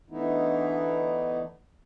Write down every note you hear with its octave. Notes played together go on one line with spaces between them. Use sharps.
D3 E3 A3 B3 D#4 E4